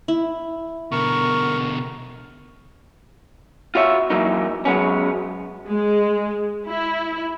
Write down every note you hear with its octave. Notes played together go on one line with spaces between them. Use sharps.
E4
B2 D3 A#4 C#6
F4 F#4 C#5 E5
E3 F#3 A#3 D#4
F#3 G#3 B3 C#4
G#3
E4